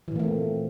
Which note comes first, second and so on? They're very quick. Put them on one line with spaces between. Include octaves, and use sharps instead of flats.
E3 A#2 A#3 A3 C4